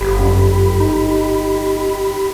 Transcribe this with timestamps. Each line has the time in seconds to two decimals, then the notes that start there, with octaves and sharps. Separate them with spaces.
0.01 G1 G4 B5
0.20 F#2
0.80 D#4